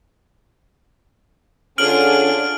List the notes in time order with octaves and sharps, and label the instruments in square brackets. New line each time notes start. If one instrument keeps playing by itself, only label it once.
[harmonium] D3 C#4 [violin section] D4 F4 G#4 [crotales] F6 D7 F#7